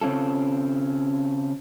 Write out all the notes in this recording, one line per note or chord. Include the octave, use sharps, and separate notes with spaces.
C#3 C4 C#4 F4 A4